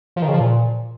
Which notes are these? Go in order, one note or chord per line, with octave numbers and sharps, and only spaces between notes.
F3
D#3
C#3
F3
A#2